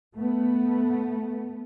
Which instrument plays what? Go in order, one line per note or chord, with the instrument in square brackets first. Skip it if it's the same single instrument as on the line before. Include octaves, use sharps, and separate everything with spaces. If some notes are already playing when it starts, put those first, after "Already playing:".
[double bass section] A3 B3